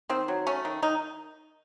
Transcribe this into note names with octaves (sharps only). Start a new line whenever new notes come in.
D#3 C4
F#3
A3 C#4
D#3
D#3 D#4